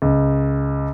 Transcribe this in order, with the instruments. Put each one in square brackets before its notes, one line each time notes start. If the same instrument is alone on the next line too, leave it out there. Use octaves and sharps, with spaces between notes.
[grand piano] C#2